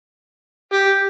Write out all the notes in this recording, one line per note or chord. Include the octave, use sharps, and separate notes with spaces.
G4